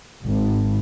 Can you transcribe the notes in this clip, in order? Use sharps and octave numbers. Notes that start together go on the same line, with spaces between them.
G#1